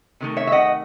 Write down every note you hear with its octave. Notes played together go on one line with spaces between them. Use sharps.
C3 D#3 A3
C#5 E5
E5
D#5 F#5